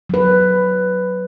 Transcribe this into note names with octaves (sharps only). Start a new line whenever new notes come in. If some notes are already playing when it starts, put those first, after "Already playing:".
F#3 B4